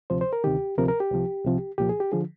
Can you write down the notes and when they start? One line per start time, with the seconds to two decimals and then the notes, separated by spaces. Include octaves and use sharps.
0.10 D2 C3 F3 C5
0.21 C5
0.33 A#4
0.44 D2 C3 D#3 G4
0.77 D2 C3 F3 A#4
0.88 A#4
1.00 G4
1.11 C2 C3 F3
1.44 C2 C3 F3
1.78 C2 A#2 F3 G4
1.89 G#4
2.00 G4
2.12 D3 F3 G#4